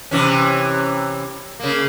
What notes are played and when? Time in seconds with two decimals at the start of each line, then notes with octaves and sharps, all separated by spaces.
0.11 C3 E3 C#4
1.60 C#3 A#3